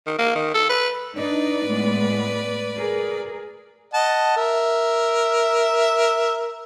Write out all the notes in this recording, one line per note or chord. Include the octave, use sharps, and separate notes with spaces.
D#3
A#3
D#3
A4
B4
D4 D#4 B4 D5
A2 G#3 B3
G#4 A#4
D#5 F#5 A5
A#4 E5